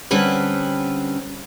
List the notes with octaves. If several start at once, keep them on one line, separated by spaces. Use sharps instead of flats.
D3 G3 C4 C#4 B4